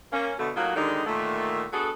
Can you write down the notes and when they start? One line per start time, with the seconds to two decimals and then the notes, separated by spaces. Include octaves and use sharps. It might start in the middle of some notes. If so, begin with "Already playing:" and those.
0.13 A#3 C#4
0.39 B2 D3 A3
0.56 A2 F#3 A#3 D#4 F4 F#4
0.76 D3 D#3 G3 G#3 D#4
1.06 A#2 D3 D#3 A3
1.73 B3 D4 F#4 G#4 A4